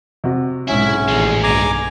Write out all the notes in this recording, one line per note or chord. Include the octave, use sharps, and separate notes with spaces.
C3 F#4
B1 G#2 G#3 C#4 E4
A1 D#2 G#3
B1 G2 G#5 A#5 D6